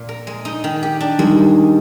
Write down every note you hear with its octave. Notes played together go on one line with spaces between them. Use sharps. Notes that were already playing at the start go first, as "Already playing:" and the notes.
Already playing: A#2
A#4
G#3
D#4
D#3
G4
D4
D#3 G3 G#3